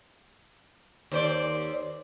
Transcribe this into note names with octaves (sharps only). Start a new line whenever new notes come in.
D#2 C5 D5